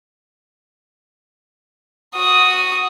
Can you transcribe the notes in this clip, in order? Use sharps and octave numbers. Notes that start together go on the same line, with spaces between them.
F#4 D#6